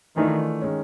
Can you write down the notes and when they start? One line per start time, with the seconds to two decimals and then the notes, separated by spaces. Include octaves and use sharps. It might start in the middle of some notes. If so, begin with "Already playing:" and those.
0.17 D#3 E3 A3 D4 F4
0.61 D#3 G#3 C#4